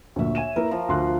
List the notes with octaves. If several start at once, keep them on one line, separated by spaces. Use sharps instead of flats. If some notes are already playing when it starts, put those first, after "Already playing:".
D2 A#2 C#5 E5
G#5 D#7 E7
A#3 E4 A#4 B4
F3 F4 A#5
D2 C6 F#6